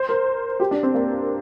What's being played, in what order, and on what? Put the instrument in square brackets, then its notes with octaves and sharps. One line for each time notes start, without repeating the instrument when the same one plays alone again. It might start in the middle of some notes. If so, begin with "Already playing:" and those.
Already playing: [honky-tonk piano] C5
A#4
G4
D4
C4
A#3